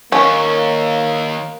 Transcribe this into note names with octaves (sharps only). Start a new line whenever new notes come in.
D#2 A#3 C#4